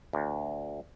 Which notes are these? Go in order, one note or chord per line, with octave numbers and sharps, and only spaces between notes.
D2